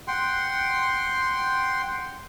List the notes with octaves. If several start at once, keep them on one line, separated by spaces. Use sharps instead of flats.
F#5 G5 C6